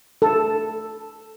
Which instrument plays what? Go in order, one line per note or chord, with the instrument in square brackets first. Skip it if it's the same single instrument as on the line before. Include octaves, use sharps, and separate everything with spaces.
[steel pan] A4